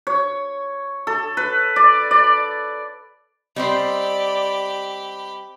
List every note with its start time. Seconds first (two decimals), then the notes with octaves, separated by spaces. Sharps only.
0.07 C#5
1.07 A4
1.37 B4
1.76 D5
2.11 D5
3.56 G3 C4 G4 C5 D5 D#5 B5